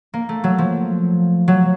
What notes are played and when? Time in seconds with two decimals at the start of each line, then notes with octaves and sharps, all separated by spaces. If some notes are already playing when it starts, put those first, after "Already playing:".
0.14 A#3
0.29 A3
0.44 F#3
0.58 F3
1.48 F#3